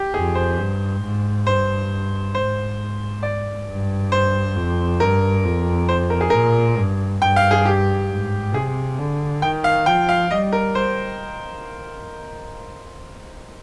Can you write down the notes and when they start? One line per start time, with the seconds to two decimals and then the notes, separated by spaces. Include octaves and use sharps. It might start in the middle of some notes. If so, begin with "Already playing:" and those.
Already playing: G4
0.14 F2 G#4
0.35 C5
0.58 G2
1.02 G#2
1.46 G2 C5
2.35 G#2 C5
3.23 D5
3.67 G2
4.12 C5
4.56 F2
5.00 G2 A#4
5.44 F2
5.89 C5
6.10 A#4
6.21 G#4
6.30 A#2 A#4
6.77 G2
7.21 G2 G5
7.36 F5
7.51 G#4
7.65 G4
8.09 G#2
8.53 C3 G#4
8.98 D3
9.42 D#3 G5
9.64 F5
9.86 F3 G5
10.09 F5
10.31 G3 D#5
10.52 A#4
10.75 C5